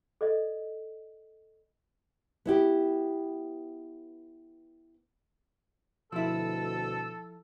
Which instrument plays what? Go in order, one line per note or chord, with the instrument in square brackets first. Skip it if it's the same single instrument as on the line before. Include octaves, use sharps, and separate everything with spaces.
[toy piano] A4 D5 D#5
[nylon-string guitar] B3 E4 G4
[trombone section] D2 B2 [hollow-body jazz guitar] F3 E4 [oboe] A4 [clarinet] E6